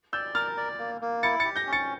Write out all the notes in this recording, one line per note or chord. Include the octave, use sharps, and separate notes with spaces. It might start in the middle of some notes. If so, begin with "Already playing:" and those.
D5 E6 G6
A#4 F6 A6
D5
A#3
A#3
E4 A6 C#7
A6 C#7
G4
G6 A#6
C#4
A6 C#7